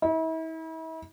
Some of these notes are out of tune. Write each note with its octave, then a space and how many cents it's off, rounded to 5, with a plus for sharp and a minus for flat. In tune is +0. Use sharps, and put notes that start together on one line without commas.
E4 -40